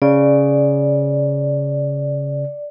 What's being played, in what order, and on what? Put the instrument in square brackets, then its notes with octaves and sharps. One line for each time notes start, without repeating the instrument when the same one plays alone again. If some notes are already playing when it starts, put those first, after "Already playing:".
[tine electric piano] C#3 [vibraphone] D5